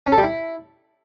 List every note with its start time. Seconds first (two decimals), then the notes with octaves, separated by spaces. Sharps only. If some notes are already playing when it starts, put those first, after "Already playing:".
0.07 C#4
0.12 A4
0.18 G3
0.23 E4